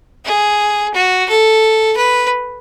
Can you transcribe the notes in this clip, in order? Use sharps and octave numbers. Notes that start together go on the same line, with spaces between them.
G#4
F#4
A4
B4